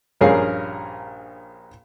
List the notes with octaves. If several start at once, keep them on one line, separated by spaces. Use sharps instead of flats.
A#1 G2 C#4 G#4 A#4 F5